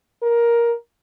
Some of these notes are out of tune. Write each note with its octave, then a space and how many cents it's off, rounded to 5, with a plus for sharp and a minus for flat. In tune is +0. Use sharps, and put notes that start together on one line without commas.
A#4 +10